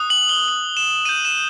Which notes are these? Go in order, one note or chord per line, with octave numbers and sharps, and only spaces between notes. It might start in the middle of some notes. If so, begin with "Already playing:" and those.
Already playing: D#6 F#6
F#7
G7
F#7
E7
D#6 G6 D#7
E7